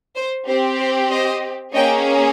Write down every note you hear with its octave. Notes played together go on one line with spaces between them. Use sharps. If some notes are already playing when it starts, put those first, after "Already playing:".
C5
C4 G4 C5
C5
C5 D#5
A#3 C#4 G#4 D#5 G5